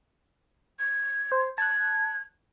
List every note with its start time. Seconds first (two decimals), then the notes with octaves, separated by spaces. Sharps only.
0.79 G#6
1.32 C5
1.58 A5 F#6 G#6